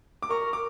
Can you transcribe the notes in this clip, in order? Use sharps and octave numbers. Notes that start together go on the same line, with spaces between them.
D6
A#4 C#6
D6